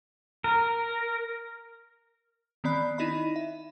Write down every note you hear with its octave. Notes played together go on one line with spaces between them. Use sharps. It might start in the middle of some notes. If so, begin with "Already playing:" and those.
A#4
D#3 B3 C4 D5 B5 F#6
D#4 E4 D#5 B5
E5